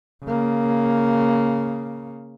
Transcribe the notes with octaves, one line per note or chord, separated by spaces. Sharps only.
C#3 A#3